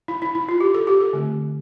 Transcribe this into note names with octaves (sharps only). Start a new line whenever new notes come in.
E4
E4
E4
F4
G4
A4
G4
A4
D3 A3 C4